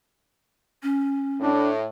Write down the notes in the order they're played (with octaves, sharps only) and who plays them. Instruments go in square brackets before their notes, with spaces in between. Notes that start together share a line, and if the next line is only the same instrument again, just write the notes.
[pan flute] C#4
[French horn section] A2 [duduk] D4